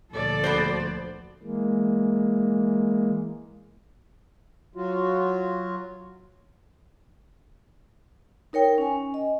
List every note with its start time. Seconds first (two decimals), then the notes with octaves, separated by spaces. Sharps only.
0.12 D2 A#2 F3 A4 D5
0.44 B3 F#4 C5
1.43 E3 G#3 A#3
4.76 F#3 F4 F#4
8.53 D#4 A#4 C#5 G5
8.78 C#4 G#5
9.14 D#5